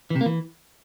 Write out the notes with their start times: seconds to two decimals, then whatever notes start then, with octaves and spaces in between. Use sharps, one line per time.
0.10 E3
0.16 C3
0.21 A#3
0.26 E3